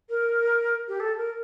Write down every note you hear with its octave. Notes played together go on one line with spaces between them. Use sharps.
A#4
G4
A4
A#4